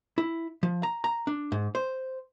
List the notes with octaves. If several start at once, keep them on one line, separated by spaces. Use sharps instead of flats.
E4
F3
A#5
A#5
D4
G#2
C5